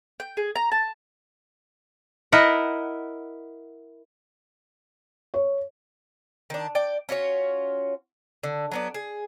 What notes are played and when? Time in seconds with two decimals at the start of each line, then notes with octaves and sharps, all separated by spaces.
0.20 G5
0.37 G#4
0.56 A#5
0.72 A5
2.32 E4 A#4 D#5 E5 F#5
5.34 C#5
6.50 D#3 D4
6.75 D5 G5
7.09 C#4 F4 F#4 C#5
8.43 D3
8.72 F#3 B3 D4
8.94 G#4